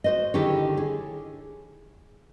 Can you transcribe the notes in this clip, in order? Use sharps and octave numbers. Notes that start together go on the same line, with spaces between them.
F#4 C5 D#5
D3 D#3 E4 G4 G#4 C#5
G#4